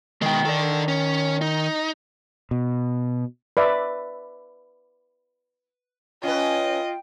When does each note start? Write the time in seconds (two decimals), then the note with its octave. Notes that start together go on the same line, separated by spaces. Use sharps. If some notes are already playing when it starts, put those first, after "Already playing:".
0.22 B2 D#3 G#3 G5
0.45 A4 D5
0.88 C#4
1.42 D#4
2.51 B2
3.57 B4 D5 E5
6.23 C#4 F4 B4 D#5 G5